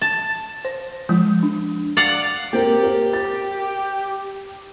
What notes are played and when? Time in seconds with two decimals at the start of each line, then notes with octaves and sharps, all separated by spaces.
0.02 A5
0.65 C5
1.09 F3 G#3
1.43 D4
1.97 D5 F5 F#5
2.53 A#3 C4 G4 A#4
2.83 A#4 C5
3.13 A6